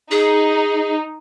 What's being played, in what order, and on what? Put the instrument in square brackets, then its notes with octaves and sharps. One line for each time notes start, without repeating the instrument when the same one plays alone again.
[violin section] D#4 [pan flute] G#4